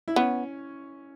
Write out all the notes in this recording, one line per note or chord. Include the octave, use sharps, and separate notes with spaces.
E4
B3 C#4